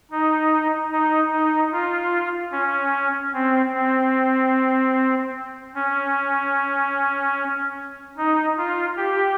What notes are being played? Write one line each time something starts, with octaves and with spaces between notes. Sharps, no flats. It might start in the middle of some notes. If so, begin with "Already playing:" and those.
D#4
D#4
D#4
F4
C#4
C4
C4
C#4
D#4
F4
G4